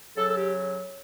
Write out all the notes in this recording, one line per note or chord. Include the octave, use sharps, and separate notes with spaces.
C#3 F#3 A4
A4
G4